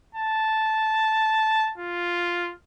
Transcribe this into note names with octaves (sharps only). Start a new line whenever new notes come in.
A5
F4